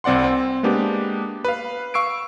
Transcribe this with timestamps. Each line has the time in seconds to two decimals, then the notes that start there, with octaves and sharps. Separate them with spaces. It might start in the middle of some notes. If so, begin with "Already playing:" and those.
0.04 C2 C4 D5 F#5 C6
0.24 C4
0.63 G#3 A#3 B3 D4 G4
1.45 B4 F5
1.94 F5 C#6 E6 C7 D7